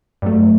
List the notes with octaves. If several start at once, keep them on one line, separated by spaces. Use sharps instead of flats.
G2 F#3 A3